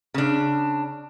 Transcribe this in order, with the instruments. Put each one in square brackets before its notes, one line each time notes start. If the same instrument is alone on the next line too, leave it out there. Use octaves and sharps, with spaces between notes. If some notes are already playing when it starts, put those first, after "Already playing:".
[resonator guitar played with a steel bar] C#3 D4